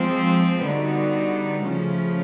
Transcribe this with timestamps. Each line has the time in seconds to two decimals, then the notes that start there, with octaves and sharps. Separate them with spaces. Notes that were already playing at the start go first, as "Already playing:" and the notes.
Already playing: F3 G#3 C4
0.64 D3 G3 B3 D#4 F#4
1.62 C#3 F3 A3 C#4